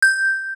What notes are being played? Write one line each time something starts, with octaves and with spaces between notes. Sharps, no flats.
G6